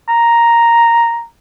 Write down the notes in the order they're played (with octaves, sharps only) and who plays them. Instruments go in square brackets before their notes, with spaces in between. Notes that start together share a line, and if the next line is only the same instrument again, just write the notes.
[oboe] A#5